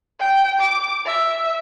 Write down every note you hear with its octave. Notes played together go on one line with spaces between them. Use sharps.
G5
D6
E5